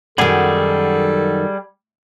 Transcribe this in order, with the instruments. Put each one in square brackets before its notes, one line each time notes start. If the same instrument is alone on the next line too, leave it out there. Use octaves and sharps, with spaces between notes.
[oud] F#2 D#3 [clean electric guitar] G3 G#4 [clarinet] A4